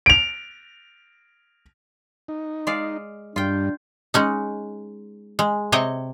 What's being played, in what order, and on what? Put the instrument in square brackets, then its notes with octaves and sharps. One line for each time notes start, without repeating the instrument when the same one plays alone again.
[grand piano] D7 F7
[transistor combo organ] D#4
[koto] G#3 D5 F5
[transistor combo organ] G2 [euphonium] D4 [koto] F4 G5
[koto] G#3 C#4 D#4
G#3
C3 C#5 D#5 G5